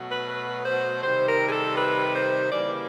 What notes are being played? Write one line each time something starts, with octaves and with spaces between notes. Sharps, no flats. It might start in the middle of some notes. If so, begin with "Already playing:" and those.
Already playing: B2 F#3 A3
B4
B4
C5
C3 D#3 G3 C4 C5
A#4
G#4
A4
B4
C5
C#3 E3 G3 A#3 D5